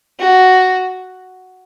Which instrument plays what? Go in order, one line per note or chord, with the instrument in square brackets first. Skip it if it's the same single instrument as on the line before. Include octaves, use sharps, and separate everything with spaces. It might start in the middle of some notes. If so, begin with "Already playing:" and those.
[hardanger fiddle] F#4